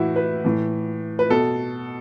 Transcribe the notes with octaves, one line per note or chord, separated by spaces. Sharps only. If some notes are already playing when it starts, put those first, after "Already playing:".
Already playing: A2 E3 E4 F#4
B4
A2 E3
B4
B2 A4